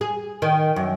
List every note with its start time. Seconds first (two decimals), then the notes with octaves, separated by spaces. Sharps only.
0.01 G#4
0.42 D#3
0.76 F#2